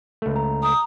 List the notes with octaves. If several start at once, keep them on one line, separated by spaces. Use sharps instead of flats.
C#2 A3
A#5
A#5 D#6